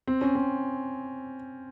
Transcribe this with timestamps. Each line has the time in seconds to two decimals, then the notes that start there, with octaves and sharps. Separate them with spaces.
0.07 C4
0.21 C#4
0.35 C4